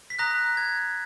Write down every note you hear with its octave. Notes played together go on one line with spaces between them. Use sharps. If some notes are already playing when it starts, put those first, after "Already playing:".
B6
A#5 D#6 F#6 A#6
G#6